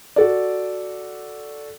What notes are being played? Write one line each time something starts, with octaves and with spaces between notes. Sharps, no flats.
F#4 A4 D5